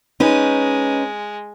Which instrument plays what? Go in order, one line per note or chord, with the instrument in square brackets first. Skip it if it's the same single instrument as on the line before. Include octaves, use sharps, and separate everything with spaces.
[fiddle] G#3 [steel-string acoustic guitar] C#4 D#4 B4